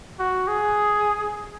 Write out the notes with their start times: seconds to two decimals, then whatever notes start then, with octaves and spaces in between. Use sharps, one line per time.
0.19 F#4
0.48 G#4